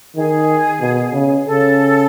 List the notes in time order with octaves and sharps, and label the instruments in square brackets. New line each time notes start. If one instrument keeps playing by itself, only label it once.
[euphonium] D#3 [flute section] G#4
[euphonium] B2
C#3
[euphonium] C#3 [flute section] A4